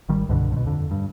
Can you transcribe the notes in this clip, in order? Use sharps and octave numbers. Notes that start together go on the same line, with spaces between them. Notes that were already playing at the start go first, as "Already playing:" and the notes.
G#1 D#3 G3
C2 G2 B2 D3
G#2 B2
F2 D3
G2